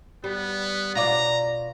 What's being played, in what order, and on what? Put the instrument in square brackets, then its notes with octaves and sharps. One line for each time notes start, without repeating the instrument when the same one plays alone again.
[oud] G3 [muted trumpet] B3
[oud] B2 F4 D5 [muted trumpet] A#5